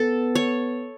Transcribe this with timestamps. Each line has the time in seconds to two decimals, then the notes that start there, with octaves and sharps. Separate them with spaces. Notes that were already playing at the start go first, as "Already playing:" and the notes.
Already playing: B3 A4
0.35 C#5